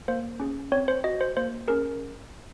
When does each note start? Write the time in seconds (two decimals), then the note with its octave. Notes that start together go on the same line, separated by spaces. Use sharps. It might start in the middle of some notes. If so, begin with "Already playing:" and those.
0.08 A#3 C5
0.40 C#4 G#4
0.72 C4 C#5
0.88 C5
1.04 F#4 D#5
1.21 C5
1.37 A#3 C5
1.68 C#4 G#4 A#4